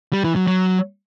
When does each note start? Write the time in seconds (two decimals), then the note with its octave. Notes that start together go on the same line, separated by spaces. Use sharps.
0.13 G3
0.24 E3
0.36 F#3
0.47 F#3